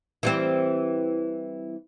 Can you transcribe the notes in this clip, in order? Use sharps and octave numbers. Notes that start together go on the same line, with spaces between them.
E3 G3 C4